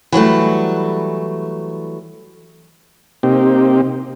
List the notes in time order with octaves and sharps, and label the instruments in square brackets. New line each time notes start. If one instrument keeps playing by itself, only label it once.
[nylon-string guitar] E3 F#3 G3 A3
[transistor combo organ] C3 A#3 C4 D#4 G4